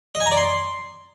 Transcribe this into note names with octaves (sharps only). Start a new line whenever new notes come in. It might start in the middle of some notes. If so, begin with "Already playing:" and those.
D#5
G#5
A#5
D5
C6